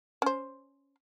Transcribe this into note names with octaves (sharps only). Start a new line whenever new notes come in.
C#4 C5